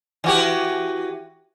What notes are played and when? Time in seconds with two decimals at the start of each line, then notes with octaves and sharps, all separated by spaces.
0.24 E3 F#4 G4